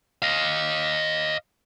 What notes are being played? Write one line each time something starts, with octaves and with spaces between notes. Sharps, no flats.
D#5 F5